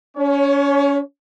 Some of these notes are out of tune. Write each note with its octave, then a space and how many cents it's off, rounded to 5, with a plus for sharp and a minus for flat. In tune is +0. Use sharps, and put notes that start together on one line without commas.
C#4 +30 C#5 -5